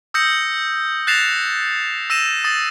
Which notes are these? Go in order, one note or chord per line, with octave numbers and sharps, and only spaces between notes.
D#6 E6 G6 A#6 C#7
F#6 A6 A#6 C7 E7 F7
E6 A#6 D#7 E7
D#6 A6